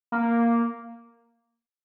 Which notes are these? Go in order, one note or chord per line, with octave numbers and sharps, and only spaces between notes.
A#3